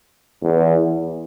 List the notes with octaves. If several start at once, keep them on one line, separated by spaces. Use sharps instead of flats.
E2